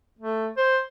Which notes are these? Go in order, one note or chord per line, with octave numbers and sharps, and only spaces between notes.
A3
C5